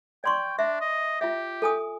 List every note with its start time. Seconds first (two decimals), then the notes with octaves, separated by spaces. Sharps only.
0.24 D5 G5 C6 C#6
0.59 D4 E5
0.81 D#5
1.21 F4 G4 E5
1.62 A4 G#5 D#6